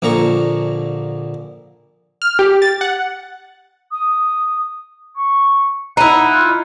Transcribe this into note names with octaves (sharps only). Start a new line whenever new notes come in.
A#1 A#2 D3 A#5 C#6
F6
G4
A6
F#5
D#6
C#6
D#4 E4 F#5
F4